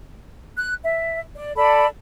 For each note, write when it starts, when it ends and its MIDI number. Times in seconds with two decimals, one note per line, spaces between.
0.56 0.73 90
0.83 1.21 76
1.35 1.51 74
1.56 1.86 69
1.56 1.86 74
1.56 1.86 81
1.56 1.86 83